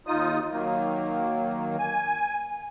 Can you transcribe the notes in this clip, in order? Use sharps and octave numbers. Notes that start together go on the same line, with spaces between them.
D#2 D#4 F4 D#6
D#3 F#3 A#3
G#5